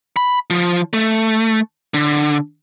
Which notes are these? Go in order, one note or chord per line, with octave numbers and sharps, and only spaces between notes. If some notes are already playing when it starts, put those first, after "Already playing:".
B5
F3
A3
D3